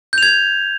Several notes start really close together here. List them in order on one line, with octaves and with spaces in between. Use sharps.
G6 F7 G#6